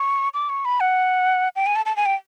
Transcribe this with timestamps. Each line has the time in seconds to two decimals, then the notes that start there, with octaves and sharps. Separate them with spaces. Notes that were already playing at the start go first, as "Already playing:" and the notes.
Already playing: C#6
0.34 D6
0.49 C#6
0.65 B5
0.80 F#5
1.56 G5
1.66 G#5
1.76 A5
1.86 A5
1.97 G#5
2.06 G5